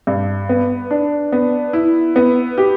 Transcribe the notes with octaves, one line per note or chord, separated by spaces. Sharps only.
G2
B3
D4
B3
E4
B3
G4